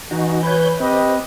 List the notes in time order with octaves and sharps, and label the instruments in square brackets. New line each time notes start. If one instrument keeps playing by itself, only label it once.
[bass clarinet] E3 [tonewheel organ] D#4 F#4
[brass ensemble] B4 [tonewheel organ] C#5 G6
[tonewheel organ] C4 [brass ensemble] G4 B4 D#5